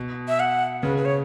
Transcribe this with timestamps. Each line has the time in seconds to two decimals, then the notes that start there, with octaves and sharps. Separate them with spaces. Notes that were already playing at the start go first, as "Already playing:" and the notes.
Already playing: B2
0.28 E5
0.40 F#5
0.83 C#3 B4
0.97 B4
1.05 C#5